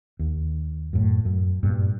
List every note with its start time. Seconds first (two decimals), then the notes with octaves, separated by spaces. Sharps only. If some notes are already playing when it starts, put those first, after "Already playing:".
0.19 D#2
0.93 F#2 A2
1.25 F#2
1.63 G2 A#2